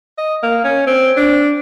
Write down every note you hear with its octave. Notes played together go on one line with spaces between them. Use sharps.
D#5
A#3
C#4
C4
D4